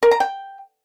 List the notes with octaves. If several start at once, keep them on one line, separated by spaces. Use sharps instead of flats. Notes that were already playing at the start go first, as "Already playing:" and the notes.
A#4
A#5
G5